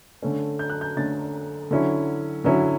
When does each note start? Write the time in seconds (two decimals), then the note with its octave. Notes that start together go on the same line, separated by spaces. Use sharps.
0.22 D3 A3 C#4
0.59 G6
0.70 F#6
0.81 G6
0.97 D3 A3 C#4 A6
1.71 D3 F#3 C#4 E4
2.44 D3 F#3 C#4 E4